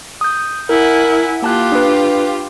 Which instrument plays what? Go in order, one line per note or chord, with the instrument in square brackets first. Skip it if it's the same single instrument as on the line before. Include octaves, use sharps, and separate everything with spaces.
[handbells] D#6 G6
[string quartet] E4 F#5 G#5 [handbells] A#4
[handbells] A#3 A5 F#6 [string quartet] F4 G4
[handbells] D4 B4